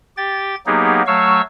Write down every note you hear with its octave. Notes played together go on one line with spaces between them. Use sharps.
G4 G5 A6
F#3 A#3 B3 D#4 G4 G#4
F#3 A3 C#5 F5 C#6 E6